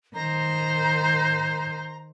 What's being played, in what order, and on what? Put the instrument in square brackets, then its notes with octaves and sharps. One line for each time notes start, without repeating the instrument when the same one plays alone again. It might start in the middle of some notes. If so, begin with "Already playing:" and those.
[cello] D#3 C5 [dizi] A#5